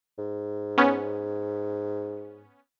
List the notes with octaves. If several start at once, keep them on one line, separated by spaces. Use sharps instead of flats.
G#2
B3 C#4